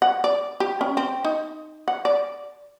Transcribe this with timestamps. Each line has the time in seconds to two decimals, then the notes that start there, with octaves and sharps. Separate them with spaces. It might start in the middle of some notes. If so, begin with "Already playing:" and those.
0.02 F#5
0.24 D5
0.60 G4
0.81 C#4
0.97 C4
1.24 D#4
1.88 F#5
2.05 D5